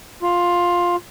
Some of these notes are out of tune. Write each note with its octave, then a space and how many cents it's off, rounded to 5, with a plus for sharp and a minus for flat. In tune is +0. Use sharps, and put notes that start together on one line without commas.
F4 +10